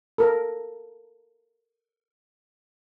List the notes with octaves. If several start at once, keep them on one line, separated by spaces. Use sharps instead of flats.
A4 A#4